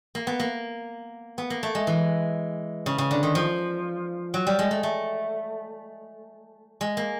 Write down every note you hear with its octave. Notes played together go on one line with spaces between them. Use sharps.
A#3
B3
A#3
B3
A#3
A3
G#3
E3
C#3
C#3
D3
D#3
F3
F#3
G3
G#3
A3
A3
G#3
A#3